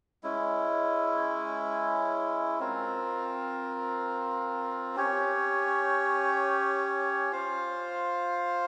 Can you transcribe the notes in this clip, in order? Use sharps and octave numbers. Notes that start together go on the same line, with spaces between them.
G#3 C#4 E4
C4 F4 A#4
C#4 G4 C#5
F4 C5 F5